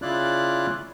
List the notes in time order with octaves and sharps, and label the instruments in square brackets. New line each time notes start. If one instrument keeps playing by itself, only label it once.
[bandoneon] C#3 E4 F4 D5 F#6